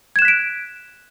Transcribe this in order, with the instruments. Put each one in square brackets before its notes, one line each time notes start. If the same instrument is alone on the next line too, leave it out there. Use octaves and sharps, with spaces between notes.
[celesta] G#6
E7
F#6
B6
D7